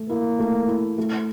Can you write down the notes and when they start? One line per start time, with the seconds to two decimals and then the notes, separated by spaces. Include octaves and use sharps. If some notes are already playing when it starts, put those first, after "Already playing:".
Already playing: A3 A4
0.09 A#3 E4
0.39 A3
0.68 E4
0.98 A3